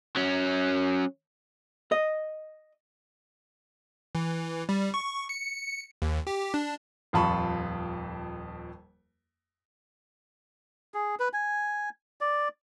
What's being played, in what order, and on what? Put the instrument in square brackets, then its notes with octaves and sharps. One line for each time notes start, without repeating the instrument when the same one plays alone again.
[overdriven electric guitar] F#3 C#4
[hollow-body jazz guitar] D#5
[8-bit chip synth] E3
G3
C#6
C#7
D#2
G4
D4
[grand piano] D#1 F2 F4 A5 B5 C#6
[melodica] G#4
B4
G#5
D5